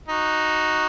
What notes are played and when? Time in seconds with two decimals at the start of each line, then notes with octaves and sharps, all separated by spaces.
0.08 D#4 F#4